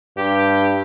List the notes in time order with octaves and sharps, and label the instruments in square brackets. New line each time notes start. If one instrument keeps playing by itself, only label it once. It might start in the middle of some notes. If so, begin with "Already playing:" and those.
[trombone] G2 [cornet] G4